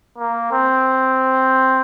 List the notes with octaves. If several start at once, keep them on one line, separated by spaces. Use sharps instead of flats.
A#3
C4